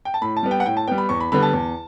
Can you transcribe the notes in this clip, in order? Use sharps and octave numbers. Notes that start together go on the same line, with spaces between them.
G5
A5
A2 B5
A5
G3 B3
G5
F#5
A2 G5
A5
G3 B3 G5
B5
E2 C#6
B5
D3 G3 B3 B5
A5
E2